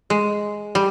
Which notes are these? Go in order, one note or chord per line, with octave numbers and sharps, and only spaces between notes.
G#3
G3